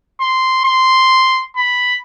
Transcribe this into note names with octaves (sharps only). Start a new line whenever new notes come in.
C6
C6
B5